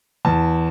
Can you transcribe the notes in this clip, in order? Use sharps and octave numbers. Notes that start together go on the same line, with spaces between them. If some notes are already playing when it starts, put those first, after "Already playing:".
E2 A5